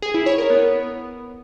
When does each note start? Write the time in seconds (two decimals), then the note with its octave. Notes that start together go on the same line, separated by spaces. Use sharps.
0.02 G#4
0.14 E4
0.26 C#5
0.38 A#4
0.50 B3